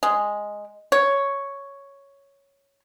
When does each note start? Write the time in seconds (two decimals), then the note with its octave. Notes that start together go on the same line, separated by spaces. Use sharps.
0.03 G#3
0.92 C#5